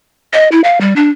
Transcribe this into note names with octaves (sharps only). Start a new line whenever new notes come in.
D#5
E4
F5
G3
D4